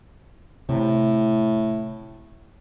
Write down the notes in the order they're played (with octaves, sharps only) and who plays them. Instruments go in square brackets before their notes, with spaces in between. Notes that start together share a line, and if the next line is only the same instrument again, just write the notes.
[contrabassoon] A2 [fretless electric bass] C3